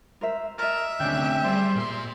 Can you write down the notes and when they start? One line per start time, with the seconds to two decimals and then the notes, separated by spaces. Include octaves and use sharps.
0.21 A#4 C5 E5
0.58 A4 A#4 D#5 E5
1.00 D2 C3 C#4 D4 G#4 G5
1.44 G3 G#4 C5 D5
1.75 A#2 C6